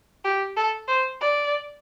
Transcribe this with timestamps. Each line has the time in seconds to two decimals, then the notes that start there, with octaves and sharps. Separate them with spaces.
0.24 G4
0.57 A4
0.88 C5
1.21 D5